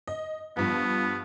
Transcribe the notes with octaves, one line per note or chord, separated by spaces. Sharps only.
D#5
G2 F3 B3